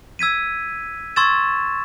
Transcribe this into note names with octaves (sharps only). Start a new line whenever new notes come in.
E6 G#6 B6 D#7
C6 C#6 E6 G#6 A6 E7